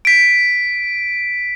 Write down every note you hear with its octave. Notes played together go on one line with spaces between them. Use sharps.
B6 D7